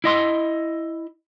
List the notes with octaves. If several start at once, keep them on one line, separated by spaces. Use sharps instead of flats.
E4 D#5 C6